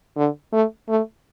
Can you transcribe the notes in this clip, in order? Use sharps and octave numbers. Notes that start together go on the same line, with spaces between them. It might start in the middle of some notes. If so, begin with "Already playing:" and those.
D3
A3
A3